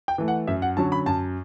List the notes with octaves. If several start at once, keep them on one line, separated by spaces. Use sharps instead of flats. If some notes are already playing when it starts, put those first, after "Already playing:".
G5
E3 A3
F#5
F#2 E5
F#5
D3 F#3 C#4 A5
B5
F#2 A5